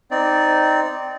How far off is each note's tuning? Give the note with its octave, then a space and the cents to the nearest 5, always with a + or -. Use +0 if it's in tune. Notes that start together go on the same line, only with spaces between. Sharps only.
C4 -20 D#4 +0 D5 -5